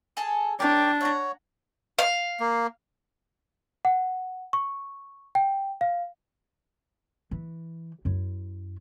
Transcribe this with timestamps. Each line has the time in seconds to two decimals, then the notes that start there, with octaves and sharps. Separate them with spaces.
0.17 G#4 A4 A5
0.60 D4 A#4 C#5 G5 D6
1.01 C#5 E5 F#5 A#5
1.99 F5
2.40 A#3
3.85 F#5
4.53 C#6
5.35 G5
5.81 F5
7.31 E3
8.05 F#2 E4